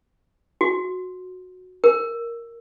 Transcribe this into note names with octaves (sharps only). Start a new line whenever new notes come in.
F#4
A#4